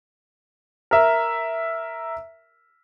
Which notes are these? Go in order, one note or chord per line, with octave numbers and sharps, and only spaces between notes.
A#4 E5